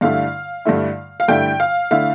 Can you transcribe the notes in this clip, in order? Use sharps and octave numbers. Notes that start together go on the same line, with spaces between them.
G2 D3 A3 E4 F5
G2 D3 A3 E4
F5
G2 D3 A3 E4 G5
F5
D3 A3 E4 F5